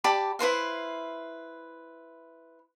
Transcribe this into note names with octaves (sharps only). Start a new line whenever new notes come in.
G4 D5 A5 B5
E4 B4 C5 F5